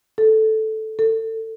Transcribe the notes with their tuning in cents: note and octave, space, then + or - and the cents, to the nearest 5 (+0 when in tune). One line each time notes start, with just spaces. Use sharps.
A4 -5
A4 +25